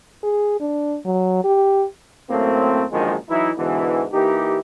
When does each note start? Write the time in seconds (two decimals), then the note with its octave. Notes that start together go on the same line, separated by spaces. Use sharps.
0.23 G#4
0.60 D4
1.05 F#3
1.44 G4
2.30 F#2 A2 A3 A#3 C4
2.91 A#1 F#2 D3 D#3 F3 G#3
3.29 E3 F#3 D#4 E4
3.57 G#2 B2 D3 E3
4.13 E3 A#3 D#4 G4